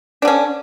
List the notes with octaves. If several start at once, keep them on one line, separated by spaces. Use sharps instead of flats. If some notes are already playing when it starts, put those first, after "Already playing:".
D3 C#4 D4